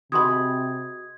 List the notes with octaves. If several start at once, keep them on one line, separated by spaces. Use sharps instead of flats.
C3 F#4 G#4 D#5 B5 C6 D#6 G#6